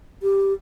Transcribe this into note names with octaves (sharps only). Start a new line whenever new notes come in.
G4